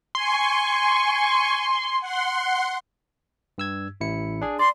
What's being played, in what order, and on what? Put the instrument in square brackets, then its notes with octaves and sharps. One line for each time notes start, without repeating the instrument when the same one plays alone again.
[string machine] G#5 C#6 [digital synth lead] C6
[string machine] F#5 C6
[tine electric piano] G2 E6 G#6
A1 E4 C#7
D4 G#4
[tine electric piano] D5 [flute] C6